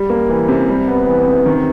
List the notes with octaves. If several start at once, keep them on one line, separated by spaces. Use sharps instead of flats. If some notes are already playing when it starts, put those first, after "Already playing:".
Already playing: G3
A#3
E3
C3
G3
B3
E3
C3
D#3